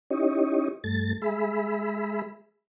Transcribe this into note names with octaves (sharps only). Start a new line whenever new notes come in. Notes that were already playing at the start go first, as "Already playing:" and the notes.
C#4 D#4 E4 G4 C#5 D#5
G2 A3 A6
G#3 G#4 E5 B5